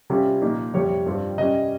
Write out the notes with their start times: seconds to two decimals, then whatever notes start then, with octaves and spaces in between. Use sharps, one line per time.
0.10 C3 G3 C#4 F4
0.42 A#2 F3 A#3 D#4
0.74 F2 C3 G3 C#5
1.06 G2 G3 C4 F4
1.38 C3 G3 C#4 D#5